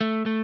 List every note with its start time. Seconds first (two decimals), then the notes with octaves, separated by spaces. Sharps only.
0.01 A3
0.26 A3